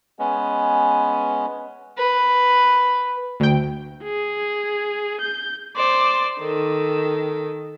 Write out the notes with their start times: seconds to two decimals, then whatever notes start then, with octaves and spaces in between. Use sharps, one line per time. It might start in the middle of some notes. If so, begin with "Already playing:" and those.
0.19 G#3 B3 C#4
1.97 B4
3.40 D2 G5
4.03 G#4
5.21 G6
5.76 C5 D5
6.40 D#3 A4